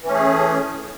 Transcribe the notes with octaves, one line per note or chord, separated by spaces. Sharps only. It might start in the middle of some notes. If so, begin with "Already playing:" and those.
E3 A3 C#4 G#4